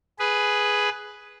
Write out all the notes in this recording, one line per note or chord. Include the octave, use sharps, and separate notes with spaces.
G#4 B4